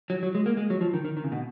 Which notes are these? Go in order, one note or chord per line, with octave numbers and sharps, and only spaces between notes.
F#3
F#3
G#3
A#3
G#3
F#3
F3
D#3
D#3
D#3
C#3
B2